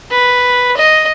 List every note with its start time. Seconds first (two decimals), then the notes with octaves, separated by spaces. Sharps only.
0.11 B4
0.77 D#5